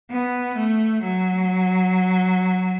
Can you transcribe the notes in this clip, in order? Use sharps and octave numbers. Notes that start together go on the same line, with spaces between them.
B3
A3
F#3